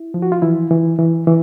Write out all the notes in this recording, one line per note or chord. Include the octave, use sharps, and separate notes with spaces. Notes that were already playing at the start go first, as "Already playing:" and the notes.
Already playing: E4
F3
F#4
F4
E3 E4
E3
E3
E3